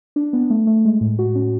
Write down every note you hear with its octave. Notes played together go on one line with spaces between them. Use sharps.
D4
B3
A3
A3
G#3
A2
F#4
C#4